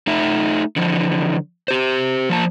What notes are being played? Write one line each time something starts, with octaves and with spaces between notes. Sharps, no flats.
A3 D#4 E5
D3 E3 F3
G4 C5
F3 A#3 A5